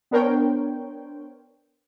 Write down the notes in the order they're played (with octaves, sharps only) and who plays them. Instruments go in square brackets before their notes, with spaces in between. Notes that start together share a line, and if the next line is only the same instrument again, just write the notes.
[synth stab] B3 D4 A#4 C5 C#5 G5